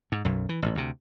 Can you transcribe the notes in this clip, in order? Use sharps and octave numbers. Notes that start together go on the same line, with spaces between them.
G#2
B1 F#2
E3
A1 A2
D2 C3